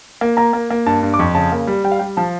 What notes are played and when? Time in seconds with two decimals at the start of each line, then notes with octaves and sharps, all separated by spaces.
0.21 A#3
0.37 A#3 A#5
0.53 A#3
0.70 A#3
0.86 G2 A5
1.03 G2
1.14 D6
1.19 F2 C#6
1.35 C#3 A5
1.52 A#3
1.67 G3
1.84 G3 G5
1.92 F5
1.99 G3 G5
2.17 F3 A5